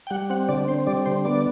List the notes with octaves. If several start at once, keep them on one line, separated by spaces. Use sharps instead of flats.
G5
G3 F#5
C4 F#5
D3 D5
C4 C5
G3 D5
D3 C5
B3 D5